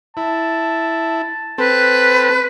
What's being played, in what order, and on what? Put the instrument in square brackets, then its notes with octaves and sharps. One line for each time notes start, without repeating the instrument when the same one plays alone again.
[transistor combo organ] E4 [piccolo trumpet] A5
[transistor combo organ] C4 A4 [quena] B4